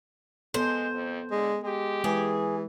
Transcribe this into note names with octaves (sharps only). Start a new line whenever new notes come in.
G#3 B3 A4 C5
F2
D3 G#3
G#3 G4
E3 G#3 G#4